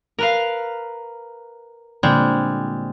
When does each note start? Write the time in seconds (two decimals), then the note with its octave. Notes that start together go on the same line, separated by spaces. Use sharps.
0.19 A#4 B4 F5
2.03 A#2 D3 G3 G#3 C4